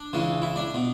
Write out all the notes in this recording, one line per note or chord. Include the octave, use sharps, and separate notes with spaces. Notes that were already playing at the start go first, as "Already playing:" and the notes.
Already playing: D4
C#2 C#3 E3
E4
D4
B2